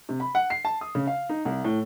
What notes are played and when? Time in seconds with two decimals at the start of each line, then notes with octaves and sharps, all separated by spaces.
0.09 C3
0.20 B5
0.35 F#5
0.50 C7
0.65 A5
0.81 D#6
0.95 C#3
1.07 F5
1.29 D#4
1.45 C2
1.65 A2